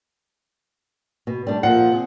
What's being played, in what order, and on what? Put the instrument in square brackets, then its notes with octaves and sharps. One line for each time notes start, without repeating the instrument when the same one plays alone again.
[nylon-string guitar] B2
G3 A3 D4
[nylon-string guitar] A#2 F3 [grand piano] F#5
[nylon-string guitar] C3 G#4